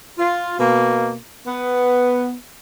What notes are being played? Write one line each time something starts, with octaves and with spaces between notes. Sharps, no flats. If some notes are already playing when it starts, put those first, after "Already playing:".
F4
B2 A#3
B3